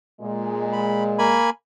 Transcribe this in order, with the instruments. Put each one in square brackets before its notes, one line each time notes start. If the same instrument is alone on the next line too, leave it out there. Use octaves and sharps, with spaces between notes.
[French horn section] A#2 G#3
[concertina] B5
A#3 G#5 B5